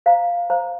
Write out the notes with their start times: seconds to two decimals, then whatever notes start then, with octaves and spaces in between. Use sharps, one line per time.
0.06 C5 F5 A#5
0.50 C5 F5 A#5